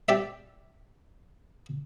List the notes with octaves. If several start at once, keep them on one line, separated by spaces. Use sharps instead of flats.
G4 D5 E5